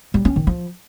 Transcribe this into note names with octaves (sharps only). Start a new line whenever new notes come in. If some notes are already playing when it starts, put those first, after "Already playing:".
G3
C#4
D#3
F3